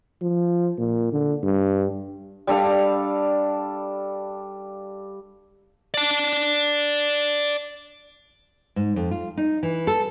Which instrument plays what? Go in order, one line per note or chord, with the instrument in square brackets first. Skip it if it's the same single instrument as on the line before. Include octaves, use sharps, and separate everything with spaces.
[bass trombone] F3
A#2
D3
G2
[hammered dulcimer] G3 D4 A4 F5
[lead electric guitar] D5 A5
[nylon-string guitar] G#2
F2
F4
D#4
E3
A4